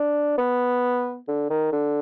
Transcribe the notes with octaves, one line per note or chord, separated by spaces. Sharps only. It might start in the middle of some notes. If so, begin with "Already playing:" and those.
Already playing: D4
B3
D3
D#3
D3